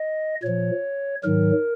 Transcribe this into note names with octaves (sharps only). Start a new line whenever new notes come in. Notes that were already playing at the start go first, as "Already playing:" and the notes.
Already playing: D#5
A#2 F3 C#5
G#2 D#3 F#3 A#4